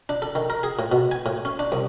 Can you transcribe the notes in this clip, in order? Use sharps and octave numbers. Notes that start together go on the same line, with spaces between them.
D4
A4
D#3
A#4
G#4
A2
B2
G#5
A2
C#4
D4
C2